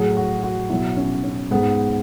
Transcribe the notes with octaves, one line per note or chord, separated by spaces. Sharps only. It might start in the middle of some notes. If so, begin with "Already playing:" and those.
Already playing: A2 F#3 G#4
F#4
F#4
B2 F#3 E4
C#4
C#4
G#2 G#3 B3